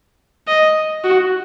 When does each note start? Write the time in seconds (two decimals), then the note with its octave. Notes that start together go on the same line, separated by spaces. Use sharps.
0.48 D#5
1.04 F#4